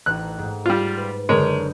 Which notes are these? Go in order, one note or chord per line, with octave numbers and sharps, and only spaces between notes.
A1 D#4 F#6
G#2
G3 F4
B4
F#1 D3 G#3 A#4 C#5 G6